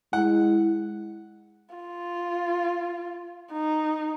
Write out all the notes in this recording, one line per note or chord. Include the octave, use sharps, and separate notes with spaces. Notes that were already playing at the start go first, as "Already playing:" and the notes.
G#3 E4 F#5
F4
D#4